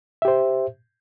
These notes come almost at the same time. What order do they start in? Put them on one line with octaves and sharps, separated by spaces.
E5 G4 C5